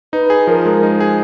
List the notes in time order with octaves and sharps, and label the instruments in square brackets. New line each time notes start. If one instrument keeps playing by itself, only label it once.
[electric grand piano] D#4 [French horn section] B4
[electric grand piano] G#4
[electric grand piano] F3 [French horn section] A#4
[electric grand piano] G#3
D#4
G#4